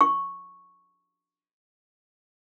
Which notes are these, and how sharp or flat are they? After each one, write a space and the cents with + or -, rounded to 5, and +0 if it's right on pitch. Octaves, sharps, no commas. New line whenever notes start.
C#6 -5